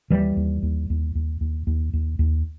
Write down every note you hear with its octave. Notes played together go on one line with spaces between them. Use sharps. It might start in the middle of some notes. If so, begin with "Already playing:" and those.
D#2 E3 G3
D#2
D#2
D#2
D#2
D#2
D#2
D#2
D#2